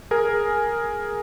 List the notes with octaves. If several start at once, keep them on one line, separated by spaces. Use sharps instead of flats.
G#4 A#4 G#5